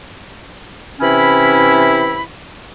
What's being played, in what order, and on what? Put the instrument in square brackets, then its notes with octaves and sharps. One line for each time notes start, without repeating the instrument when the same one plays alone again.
[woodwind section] C3 E3 C#4 E4 B5